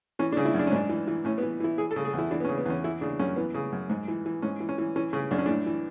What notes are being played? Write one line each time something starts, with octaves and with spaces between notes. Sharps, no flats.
E3 C#4
D4
C#3
E4
F#2
D4
C#4
G#2 D4
E3
E3
A2 C#4
B3
E3
E3 E4
E3 G#4
A4
C#3
G#4
E2 E4
E3 D4
B3
C#4
C#3
B3
E2 C#4
E3 E4
C#3 D4
F#2 C#4
E3 B3
C#3
F#2
G#2
E3
E3
G#2 C#4
E3
C#4
E3
E3 C#4
C#3 C#4
F#2 D4
C#4
A2 D4
E3